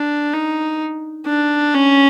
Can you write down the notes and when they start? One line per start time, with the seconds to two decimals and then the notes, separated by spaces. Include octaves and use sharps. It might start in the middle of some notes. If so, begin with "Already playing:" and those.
Already playing: D4
0.34 D#4
1.27 D4
1.74 C#4